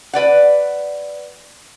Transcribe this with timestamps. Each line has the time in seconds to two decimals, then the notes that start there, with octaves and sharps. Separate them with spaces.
0.13 B4 D5 F#5